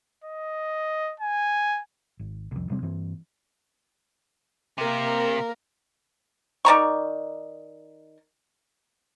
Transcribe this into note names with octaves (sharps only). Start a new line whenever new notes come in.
D#5
G#5
G#1
C2 F2
E1 C3 G3 C4
G2 E3 C4
C3 A#3 A#4
D#3 D5 A#5 C#6